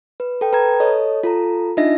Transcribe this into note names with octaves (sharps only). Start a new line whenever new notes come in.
B4
A4 G5
B4 A#5 G#6
A4 C#5 D#5
F4 A4 A#5
D4 D#4 F4 D#5 E5 A#6